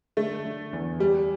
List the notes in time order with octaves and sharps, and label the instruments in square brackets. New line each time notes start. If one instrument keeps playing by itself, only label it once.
[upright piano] D3 [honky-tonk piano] A3
[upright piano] D3
E2
[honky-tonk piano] G3 [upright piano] G4